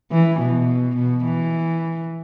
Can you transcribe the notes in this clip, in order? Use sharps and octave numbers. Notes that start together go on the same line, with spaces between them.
E3
B2
B2
E3